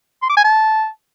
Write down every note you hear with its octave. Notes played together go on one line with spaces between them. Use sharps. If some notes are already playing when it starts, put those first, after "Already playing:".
C6
D6
G#5
A5